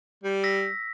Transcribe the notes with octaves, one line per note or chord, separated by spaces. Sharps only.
G3
E6 A#6 B6